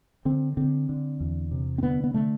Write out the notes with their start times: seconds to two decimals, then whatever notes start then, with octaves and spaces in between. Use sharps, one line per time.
0.25 D3 C4
0.57 D3 C4
0.89 D3
1.20 E2
1.51 C3
1.78 C4
1.83 D3 B3
2.04 B3
2.14 D3 A3